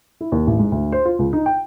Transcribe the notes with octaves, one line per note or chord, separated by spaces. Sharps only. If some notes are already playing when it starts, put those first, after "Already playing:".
E4
D#2
A1
G#2
D2
C5
F4
C#2
D#4
G5